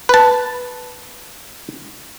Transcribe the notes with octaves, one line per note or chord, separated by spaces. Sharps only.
B4 A5